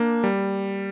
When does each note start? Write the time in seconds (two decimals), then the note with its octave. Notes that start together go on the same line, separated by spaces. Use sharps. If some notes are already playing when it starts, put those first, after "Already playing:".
Already playing: A#3 D4
0.24 G3